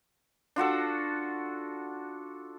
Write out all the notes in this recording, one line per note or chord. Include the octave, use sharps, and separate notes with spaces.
D4 F4 F#4 A4